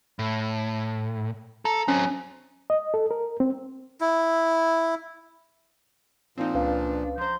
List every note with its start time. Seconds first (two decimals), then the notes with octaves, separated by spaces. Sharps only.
0.19 A2
1.65 A4 A#5
1.88 F#3 C4 C#4
2.70 D#5
2.94 A4
3.11 A#4
3.40 C4
4.01 E4
6.37 A#2 F3 C4 D#4
6.54 C#2 C#4 D4 B4 F5
7.18 F3 C5 A#5 C6 G6